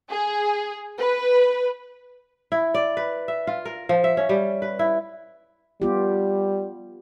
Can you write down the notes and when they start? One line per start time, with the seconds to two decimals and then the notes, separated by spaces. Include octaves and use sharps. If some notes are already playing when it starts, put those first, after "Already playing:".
0.10 G#4
0.98 B4
2.52 E4
2.74 D5
2.97 B4
3.28 E5
3.47 F4
3.65 A#4
3.89 F3
4.04 E5
4.17 C#4
4.29 G3
4.62 B4
4.79 E4
5.82 G3 B3 F4 G4